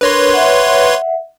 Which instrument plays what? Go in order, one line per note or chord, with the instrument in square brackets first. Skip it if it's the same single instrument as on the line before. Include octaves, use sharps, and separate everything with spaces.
[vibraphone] D4 A#4 [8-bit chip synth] B4 C#5 C6
[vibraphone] E5 F#5